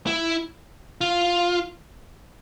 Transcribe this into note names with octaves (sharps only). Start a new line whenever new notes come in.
E4
F4